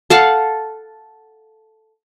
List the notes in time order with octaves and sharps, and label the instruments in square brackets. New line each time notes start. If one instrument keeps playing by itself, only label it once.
[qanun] A4 F5 F#5 A5